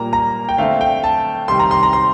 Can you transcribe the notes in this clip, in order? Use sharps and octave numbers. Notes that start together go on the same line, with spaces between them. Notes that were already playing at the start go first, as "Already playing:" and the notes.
Already playing: A#2 G3 A#3 A#5
A#5
G5
D3 A3 C4 F5
G5
A5
C3 D#3 G3 C6
A#5
C6
A#5
C6